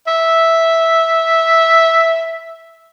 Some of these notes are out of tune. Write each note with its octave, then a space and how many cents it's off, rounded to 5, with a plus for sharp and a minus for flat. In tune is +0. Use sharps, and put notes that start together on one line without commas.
E5 -5